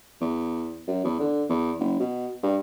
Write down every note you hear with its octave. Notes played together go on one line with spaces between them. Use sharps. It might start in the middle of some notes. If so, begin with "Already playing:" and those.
E2
F#2
E2
D3
E2
F#1
B2
G2